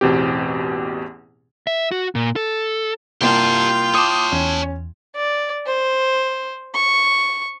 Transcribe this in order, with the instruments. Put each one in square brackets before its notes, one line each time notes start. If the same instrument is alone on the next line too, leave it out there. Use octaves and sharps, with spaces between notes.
[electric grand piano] A1 E2 B2 C4 G4
[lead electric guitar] E5
F#4
A#2
A4
[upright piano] C2 A#3 [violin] F4 G5 [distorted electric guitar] G4 A5
[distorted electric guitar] C#5 A5 [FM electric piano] D6 D#6
[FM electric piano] E2 [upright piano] C#4
[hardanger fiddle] D5
C5
C#6